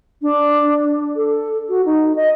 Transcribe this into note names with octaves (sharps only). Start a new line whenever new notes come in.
D4
A4
F#4
D#4
D#5